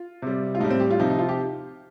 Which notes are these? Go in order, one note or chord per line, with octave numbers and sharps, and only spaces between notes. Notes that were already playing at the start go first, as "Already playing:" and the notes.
Already playing: F4
C3 G3
F4
A2 G3 D#4
C4
G4
F4
C3 F3 D#4
D#4
F4
G4